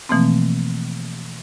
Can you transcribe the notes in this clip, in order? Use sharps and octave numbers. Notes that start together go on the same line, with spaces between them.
B2 E3 F3 A3 A#3 C4